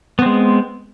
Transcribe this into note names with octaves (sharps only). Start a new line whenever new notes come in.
G#3 B3 C4